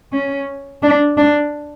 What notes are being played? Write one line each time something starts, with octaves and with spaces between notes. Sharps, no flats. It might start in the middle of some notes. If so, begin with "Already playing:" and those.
C#4
D4
D4